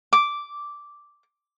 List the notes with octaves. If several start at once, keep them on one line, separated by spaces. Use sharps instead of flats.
D6